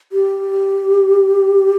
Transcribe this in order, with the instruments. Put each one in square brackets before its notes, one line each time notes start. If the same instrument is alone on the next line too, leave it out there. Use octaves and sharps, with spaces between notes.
[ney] G4